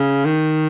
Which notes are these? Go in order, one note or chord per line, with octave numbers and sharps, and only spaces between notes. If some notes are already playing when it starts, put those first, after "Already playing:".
Already playing: C#3
D#3